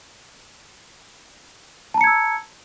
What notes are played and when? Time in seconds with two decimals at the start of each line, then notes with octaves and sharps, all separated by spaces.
1.94 A5
1.98 A#5
2.01 C#7
2.04 G#6
2.07 E6